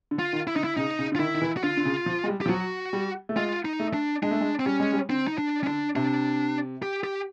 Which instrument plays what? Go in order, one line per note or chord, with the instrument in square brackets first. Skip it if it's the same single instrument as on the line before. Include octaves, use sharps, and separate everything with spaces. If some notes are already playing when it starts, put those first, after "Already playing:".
[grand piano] D3
[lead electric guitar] F4
[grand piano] D#3
[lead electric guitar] E4
[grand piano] D3 [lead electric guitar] D#4
[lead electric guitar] E4
[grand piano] C#3 [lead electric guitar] D#4
[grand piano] C#3
D3
[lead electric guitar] F4
[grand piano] D#3 [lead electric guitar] E4
[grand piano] D#3
E3
[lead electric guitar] F#4
[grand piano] D3 [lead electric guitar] F4
[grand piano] D3
C#3
F3
G#3
G3
[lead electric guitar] G4
[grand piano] F3
[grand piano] F#3 [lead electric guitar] F#4
[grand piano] G3
A3
[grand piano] G#3 [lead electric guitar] F4
[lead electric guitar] D#4
[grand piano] A3
[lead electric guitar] D4
[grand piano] G#3 [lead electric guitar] D4
[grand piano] A3
G#3
[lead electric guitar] C4
[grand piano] G3 [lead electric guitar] C#4
[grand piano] G#3
G3
[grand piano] D3 [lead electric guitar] C4
[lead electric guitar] D#4
D4
C#4
[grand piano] D3 [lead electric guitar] D4
[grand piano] C3 [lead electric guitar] D4
[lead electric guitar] G4
G4